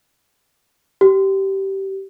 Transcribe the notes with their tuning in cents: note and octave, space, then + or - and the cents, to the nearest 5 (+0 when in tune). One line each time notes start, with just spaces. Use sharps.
G4 -20